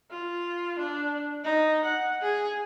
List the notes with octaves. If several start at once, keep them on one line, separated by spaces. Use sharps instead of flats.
F4
D4
D#4
F#5
G#4